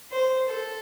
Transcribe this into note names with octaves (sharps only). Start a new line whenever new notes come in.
C5
A4